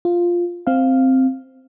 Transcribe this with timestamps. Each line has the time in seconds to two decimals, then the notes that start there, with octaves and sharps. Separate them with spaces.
0.05 F4
0.67 C4 F5